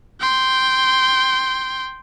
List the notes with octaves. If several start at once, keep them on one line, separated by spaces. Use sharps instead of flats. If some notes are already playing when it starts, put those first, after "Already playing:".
G5 C6